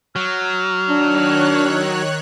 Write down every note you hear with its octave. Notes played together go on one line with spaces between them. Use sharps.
F#3 F6
D#3 D4 C#5 F#6